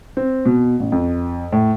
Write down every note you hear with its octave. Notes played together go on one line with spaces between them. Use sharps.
C4
B2
A1
F2
A2